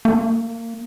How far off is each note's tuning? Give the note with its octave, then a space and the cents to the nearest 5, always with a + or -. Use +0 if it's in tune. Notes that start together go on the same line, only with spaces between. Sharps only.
A#3 -25